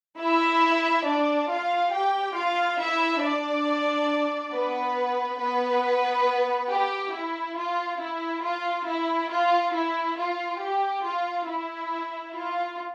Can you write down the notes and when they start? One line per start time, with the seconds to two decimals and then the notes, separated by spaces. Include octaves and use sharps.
0.19 E4 E5
1.06 D4 D5
1.50 F4 F5
1.93 G4 G5
2.36 F4 F5
2.80 E4 E5
3.23 D4 D5
4.53 B3 B4
5.40 B3 B4
6.70 G4
7.13 E4
7.57 F4
8.00 E4
8.44 F4
8.87 E4
9.30 F4
9.73 E4
10.17 F4
10.61 G4
11.04 F4
11.48 E4
12.34 F4